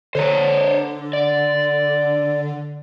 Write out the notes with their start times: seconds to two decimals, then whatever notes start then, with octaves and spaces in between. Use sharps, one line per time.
0.15 D3 C5 C#5 A#5
1.13 D5